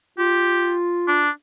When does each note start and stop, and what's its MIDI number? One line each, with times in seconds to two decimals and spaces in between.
0.19 1.27 65
0.19 0.75 67
1.08 1.30 62